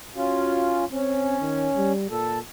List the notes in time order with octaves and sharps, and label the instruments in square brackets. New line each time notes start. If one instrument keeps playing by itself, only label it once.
[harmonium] C#4 F4 [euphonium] F#4
[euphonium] C4 [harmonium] C#4
[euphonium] D#3
G3
[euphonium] A#2 [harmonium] A4